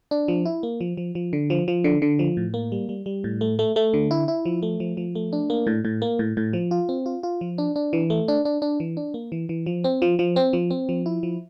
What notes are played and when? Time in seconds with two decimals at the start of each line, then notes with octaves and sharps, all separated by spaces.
0.11 D4
0.28 F3
0.45 E4
0.63 A#3
0.81 F3
0.97 F3
1.15 F3
1.33 D3
1.50 F3
1.68 F3
1.84 D3
2.02 D3
2.19 F3
2.37 A2
2.54 A#3
2.72 G3
2.89 G3
3.06 G3
3.24 A2
3.41 A3
3.59 A3
3.76 A3
3.94 D3
4.11 E4
4.28 E4
4.45 F3
4.63 A3
4.80 F3
4.97 F3
5.15 A3
5.33 D4
5.50 A#3
5.67 A2
5.85 A2
6.02 A#3
6.19 A2
6.37 A2
6.53 F3
6.71 F4
6.89 C4
7.06 F4
7.23 F4
7.41 F3
7.58 D4
7.76 D4
7.93 E3
8.10 A3
8.28 D4
8.45 D4
8.62 D4
8.80 E3
8.97 D4
9.14 A#3
9.32 E3
9.49 E3
9.66 F3
9.84 C4
10.02 F3
10.19 F3
10.36 C4
10.53 F3
10.71 C4
10.89 F3
11.06 E4
11.23 F3